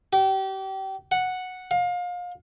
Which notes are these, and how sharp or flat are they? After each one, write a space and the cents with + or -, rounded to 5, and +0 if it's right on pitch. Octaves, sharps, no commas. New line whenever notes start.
G4 -30
F#5 -5
F5 +30